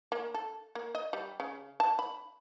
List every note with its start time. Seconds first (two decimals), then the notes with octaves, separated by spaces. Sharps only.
0.12 A#3
0.34 A4
0.75 A#3
0.95 D#5
1.13 G3
1.40 C#3
1.80 A5
1.99 B5